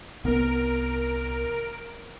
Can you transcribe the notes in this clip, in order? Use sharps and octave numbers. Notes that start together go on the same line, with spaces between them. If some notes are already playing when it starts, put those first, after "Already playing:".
C2 B3 A#4 D7